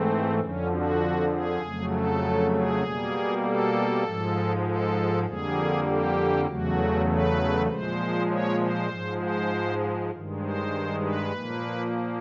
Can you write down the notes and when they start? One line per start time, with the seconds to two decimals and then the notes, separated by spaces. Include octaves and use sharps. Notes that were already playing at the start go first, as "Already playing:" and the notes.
Already playing: G#2 E3 A3 C4
0.40 F2 D3 F3 C#4
0.71 F#4
1.31 G#4
1.61 F2 C#3 F#3 A3
1.92 A4
2.52 G#4
2.83 B2 G3 A#3
3.44 A4
4.04 G#2 F3 G#3
4.65 A4
5.25 F2 D3 G3 A#3 G#4
5.86 G4
6.47 E2 C#3 F#3 A3 F#4
7.08 B4
7.68 A#2 F3 G#3 C5
8.29 C#5
8.59 C5
8.89 G#2 F3 G#3
9.19 C5
10.10 G2 D#3 G#3
10.41 C5
11.01 B4
11.32 A#2 F3 A#3